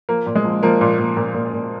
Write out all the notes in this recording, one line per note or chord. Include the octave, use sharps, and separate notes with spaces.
F3 A#3
A#2
G#3
F3
F3 A#3
A#2
A#2
A#2
A#2
A#2